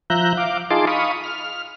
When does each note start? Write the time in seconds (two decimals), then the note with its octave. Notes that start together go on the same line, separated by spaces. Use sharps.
0.10 F3 E5 A#5 F#6 G6
0.37 F5 D6
0.70 D#4 F4 G#4 A5 C6 D6
0.87 F5 B5 C#6 D#6
1.24 F6